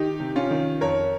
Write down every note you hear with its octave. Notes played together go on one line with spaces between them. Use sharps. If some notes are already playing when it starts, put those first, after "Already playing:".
Already playing: D#3 D#4 G4
C3
C#4 F4
D#3
F2 A#4 C#5